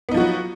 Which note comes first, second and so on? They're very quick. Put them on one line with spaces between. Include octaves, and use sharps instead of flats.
B3 D#4 F3 F#4 F#3